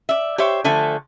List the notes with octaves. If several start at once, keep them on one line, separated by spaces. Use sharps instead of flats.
D5 E5
G4 C5 C#5 E5
D3 F3 A3 G#5